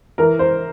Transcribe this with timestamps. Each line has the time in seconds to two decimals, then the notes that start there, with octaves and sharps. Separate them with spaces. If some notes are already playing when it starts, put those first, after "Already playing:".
0.18 E3 A#4
0.39 C5